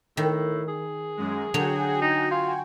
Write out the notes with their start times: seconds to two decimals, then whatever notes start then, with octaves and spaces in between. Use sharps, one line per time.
0.17 A2 D#3
0.69 G#4
1.17 F#2 G#3
1.54 D3 F#3 F#4 C#5 G5 G#5
2.02 D#4
2.31 F4